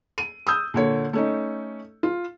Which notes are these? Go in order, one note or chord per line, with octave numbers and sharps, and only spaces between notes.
D#7
D#6 E6 G6
A#2 D3 C#5
A3 C#4 D#4
F4